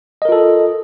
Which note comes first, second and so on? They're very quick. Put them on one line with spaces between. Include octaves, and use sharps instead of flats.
D#5 A#4 F4 A4